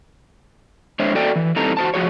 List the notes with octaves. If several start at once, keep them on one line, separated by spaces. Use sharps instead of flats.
G#3 D4 C5 C#5 E5
F#4 A4 D5 G5
E3
E3 G3 C4 D#4 A4 A#5
F#4 C5 A5
F3 F#4 G#4 C#5